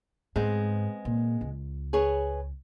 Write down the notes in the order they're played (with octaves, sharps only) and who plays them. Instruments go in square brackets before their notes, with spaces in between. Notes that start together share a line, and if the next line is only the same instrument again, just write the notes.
[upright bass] G#2 [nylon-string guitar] G#3 B3 C4
[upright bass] A#2
C#2
[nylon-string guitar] G#4 B4 C#5